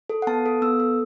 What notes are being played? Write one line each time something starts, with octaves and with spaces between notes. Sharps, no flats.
A4
F#5
B3 A5
A4
B3 E6
A4